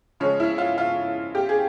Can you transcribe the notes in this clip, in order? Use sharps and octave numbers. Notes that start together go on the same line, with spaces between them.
C#3 F3 G#3 C#4
E4
F4
F4
G4
G#4